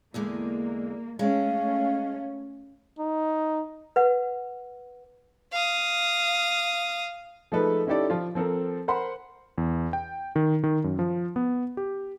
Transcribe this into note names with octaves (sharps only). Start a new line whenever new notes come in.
E2 D3 G#3 A#3
G#3 A3 C#4 F5
D#4
B4 F#5
F5 D#6
F3 G#3 A3 D#4 A4 B4
C#4 D#4 E4 G4 A4 D5
F3 F4
F3 C4 A4 A#4
A#4 C5 F#5 B5 C6
E2
G5
D#3
D#3
F#2
F3
B3
G4